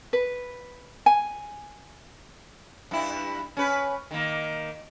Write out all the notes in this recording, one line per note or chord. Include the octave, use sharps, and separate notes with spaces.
B4
G#5
G2 E4
C#4 B4
D#3 A#3